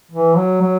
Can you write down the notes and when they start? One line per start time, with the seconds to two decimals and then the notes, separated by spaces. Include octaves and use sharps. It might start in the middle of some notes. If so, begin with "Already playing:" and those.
0.11 E3
0.36 F#3
0.62 F#3